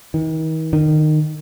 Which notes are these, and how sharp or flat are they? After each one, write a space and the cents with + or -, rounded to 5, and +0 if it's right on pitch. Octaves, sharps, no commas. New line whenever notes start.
D#3 +40
D#3 -20